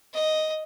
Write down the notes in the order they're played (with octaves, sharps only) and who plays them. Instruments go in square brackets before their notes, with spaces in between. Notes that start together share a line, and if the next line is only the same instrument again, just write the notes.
[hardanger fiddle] D#5